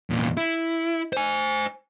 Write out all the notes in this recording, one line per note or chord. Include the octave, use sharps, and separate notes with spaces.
E2 A#2
E4
C5 G#5